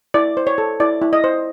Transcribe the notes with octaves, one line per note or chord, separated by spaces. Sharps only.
E4 D5
C5
C#5
A4
E4 D5
E4
D#5
C5